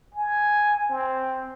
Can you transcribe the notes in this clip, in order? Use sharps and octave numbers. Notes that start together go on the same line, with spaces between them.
G#5
C4